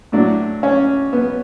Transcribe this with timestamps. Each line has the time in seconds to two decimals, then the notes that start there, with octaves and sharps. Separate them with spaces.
0.12 A2 F#3 A3 D4
0.63 C#4
1.13 B3